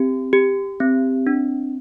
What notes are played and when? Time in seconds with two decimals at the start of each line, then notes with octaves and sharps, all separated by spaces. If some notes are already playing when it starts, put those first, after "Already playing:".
Already playing: C4 G4
0.33 G4
0.80 C4
1.27 D4